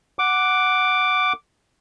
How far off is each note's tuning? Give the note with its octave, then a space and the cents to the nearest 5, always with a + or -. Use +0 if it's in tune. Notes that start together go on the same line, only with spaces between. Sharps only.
F#5 +0 D6 +0